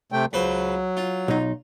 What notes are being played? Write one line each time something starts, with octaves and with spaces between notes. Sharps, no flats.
C3 A3 G5
C#2 F#3 B4 C5
F4
B1 D#4